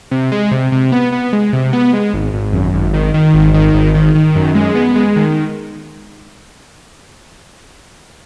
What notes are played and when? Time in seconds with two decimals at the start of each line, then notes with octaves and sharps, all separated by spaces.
0.11 C3
0.32 G#3
0.51 C3
0.72 C3
0.92 B3
1.12 B3
1.33 G#3
1.53 C3
1.73 B3
1.93 G#3
2.13 G#1
2.34 G#1
2.53 F#2
2.74 G#1
2.94 D#3
3.14 D#3
3.34 G#1
3.54 D#3
3.74 G#1
3.95 D#3
4.15 D#3
4.35 F#2
4.55 G#3
4.75 B3
4.96 G#3
5.16 D#3